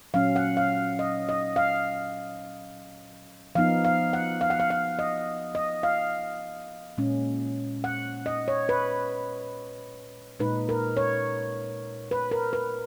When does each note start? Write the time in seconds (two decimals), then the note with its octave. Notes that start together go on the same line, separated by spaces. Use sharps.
0.14 A#2 F#3 C#4 F5
0.36 F#5
0.57 F5
0.99 D#5
1.29 D#5
1.56 F5
3.55 F3 B3 D#4 F5
3.85 F5
4.13 F#5
4.41 F5
4.50 F#5
4.60 F5
4.70 F5
4.99 D#5
5.55 D#5
5.83 F5
6.98 A#2 G#3 C#4
7.84 F#5
8.26 D#5
8.48 C#5
8.69 B4
10.40 A#2 G#3 D#4 B4
10.69 A#4
10.97 C#5
12.11 B4
12.31 A#4
12.53 B4